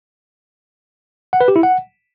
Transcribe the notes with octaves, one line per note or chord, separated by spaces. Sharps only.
F#5
B4
G4
E4
F#5